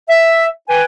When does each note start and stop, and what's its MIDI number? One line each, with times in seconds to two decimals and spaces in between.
0.09 0.45 76
0.68 0.83 71
0.68 0.83 79
0.68 0.83 80